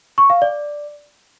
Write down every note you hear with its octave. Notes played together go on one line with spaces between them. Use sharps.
C#6
F5
D5